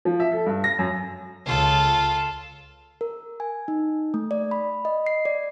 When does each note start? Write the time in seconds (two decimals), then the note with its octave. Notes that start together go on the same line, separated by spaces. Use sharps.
0.05 F3
0.20 E5
0.32 A4
0.46 G2
0.64 A#6
0.79 F#2
1.46 C#2 F4 A4
3.01 A#4
3.40 G#5
3.68 D#4
4.14 A3
4.31 D5
4.51 B5
4.85 D#5
5.06 C7
5.25 D5